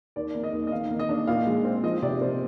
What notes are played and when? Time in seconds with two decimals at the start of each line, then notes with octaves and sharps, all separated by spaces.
0.16 D#2 D5
0.35 A#3
0.44 D#5
0.53 D#2
0.67 D#5
0.72 D#3 F5
0.91 A#3
0.99 D#5
1.09 D4
1.27 A#2 F5
1.47 G#3
1.65 C4
1.83 F3 D#5
2.02 C3 D5
2.21 A#3 C5